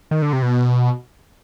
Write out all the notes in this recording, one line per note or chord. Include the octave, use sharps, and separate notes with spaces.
D#3
D3
C3
B2